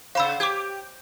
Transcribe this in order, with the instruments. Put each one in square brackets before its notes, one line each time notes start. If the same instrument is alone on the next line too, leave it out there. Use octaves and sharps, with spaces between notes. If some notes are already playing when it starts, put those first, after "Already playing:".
[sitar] C#3 C5 [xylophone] F5 B5 E6
[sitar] G4 [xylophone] D6 G#6